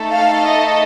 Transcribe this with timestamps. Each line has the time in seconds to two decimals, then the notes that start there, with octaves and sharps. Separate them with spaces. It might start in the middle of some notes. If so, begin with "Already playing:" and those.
Already playing: A3 D#4 A4
0.11 F5
0.45 D#5